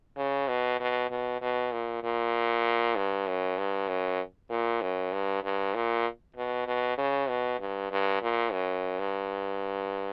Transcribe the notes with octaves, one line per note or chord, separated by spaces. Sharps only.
C#3
B2
B2
B2
B2
A#2
A#2
G2
F#2
G2
F#2
A#2
F#2
G2
G2
A#2
B2
B2
C#3
B2
G2
G2
A#2
F#2
G2